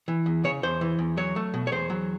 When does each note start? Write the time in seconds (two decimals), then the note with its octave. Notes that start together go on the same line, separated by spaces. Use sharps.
0.08 E3
0.26 E2
0.44 C#3 C#5
0.63 E2 C5
0.81 E3
0.99 E2
1.17 F#3 C#5
1.36 A3
1.54 B2
1.67 C#5
1.72 E2 C5
1.90 F#3